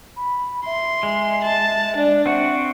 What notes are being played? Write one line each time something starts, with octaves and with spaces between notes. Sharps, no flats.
B5
E5 C6
G#3
A5
D4 D5
C4 F#4 E5